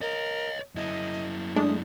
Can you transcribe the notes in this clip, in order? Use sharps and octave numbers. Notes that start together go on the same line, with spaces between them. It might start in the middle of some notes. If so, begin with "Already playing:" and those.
A#4 C#5 D#5
F#2 E4 D#5
G#3 A3 D4 D#6